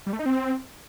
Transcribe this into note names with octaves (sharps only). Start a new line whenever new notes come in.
G3
A3
D#4
C4